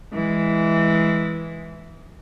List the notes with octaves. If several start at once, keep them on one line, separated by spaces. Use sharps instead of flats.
E3 G#3